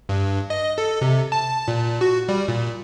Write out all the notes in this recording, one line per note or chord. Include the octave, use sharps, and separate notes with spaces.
G2
D#5
A4
C3
A5
A#2
F#4
G3
A#2